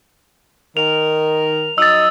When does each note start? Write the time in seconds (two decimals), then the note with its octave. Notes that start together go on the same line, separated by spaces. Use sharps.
0.77 D#3 A#4 F7
1.78 F#3 D#4 D#5 E6 A6